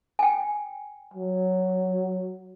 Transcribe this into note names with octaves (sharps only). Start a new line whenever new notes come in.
G5 G#5
F#3